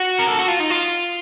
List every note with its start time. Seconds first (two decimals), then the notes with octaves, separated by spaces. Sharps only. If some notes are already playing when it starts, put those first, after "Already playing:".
Already playing: F#4
0.19 A#4
0.29 A4
0.39 F#4
0.48 F4
0.60 D#4
0.70 F4